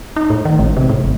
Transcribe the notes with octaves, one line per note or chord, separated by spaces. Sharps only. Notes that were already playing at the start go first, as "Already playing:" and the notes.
D#4
A2
D#3
A1
C3
A2
G#1